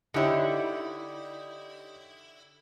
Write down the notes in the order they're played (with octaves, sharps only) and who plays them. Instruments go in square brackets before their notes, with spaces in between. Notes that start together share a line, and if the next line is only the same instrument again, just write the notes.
[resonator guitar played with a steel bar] D3 E4 [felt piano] D#4 G4 C#5